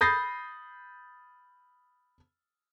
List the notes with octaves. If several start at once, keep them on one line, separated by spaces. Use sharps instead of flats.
B5 D#6 G6 A6 A#6 C7